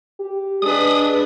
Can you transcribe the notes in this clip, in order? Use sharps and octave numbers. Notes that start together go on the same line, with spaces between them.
G4
G#3 D4 B4 D#6